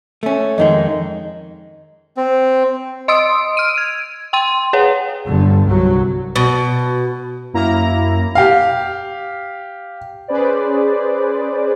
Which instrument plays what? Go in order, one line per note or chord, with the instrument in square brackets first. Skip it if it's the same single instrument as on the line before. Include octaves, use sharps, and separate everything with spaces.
[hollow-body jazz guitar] A3 C#4
[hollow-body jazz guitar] F2 D#3 G#3 [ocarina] D#5
[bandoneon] C4
[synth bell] D#5 C6 D#6 E6 D7
F6 D7 D#7
G#6
G5 C6 D#7
G#4 B4 C#5 F#5
[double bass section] G1 G2 D3
C2 F#3
[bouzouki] B2
[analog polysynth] F#2 A#3 E4 A#5
[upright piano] G4 F5
[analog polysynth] C#4 G#4 B4 C5 D5